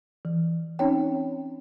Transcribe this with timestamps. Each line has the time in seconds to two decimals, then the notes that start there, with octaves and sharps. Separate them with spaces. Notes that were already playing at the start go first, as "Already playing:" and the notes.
0.25 E3
0.79 C4 C#4 D#4 C#5 G5